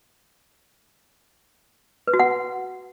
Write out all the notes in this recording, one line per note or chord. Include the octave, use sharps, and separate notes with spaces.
B4
F#4
F#5